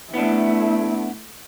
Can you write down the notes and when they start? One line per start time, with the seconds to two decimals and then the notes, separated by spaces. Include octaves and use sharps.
0.14 A3 B3 D4 E4